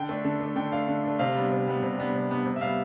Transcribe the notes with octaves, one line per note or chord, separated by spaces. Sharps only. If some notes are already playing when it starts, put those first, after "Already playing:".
Already playing: D3 G5
A3 D4
D3
A3 D4
D3 G5
A3 D4 F5
D3
A3 D4
C3 F5
G3 B3 D4
C3
G3 B3 D4
C3
G3 B3 D4
C3
G3 B3 D4
C3
E5
G3 B3 F5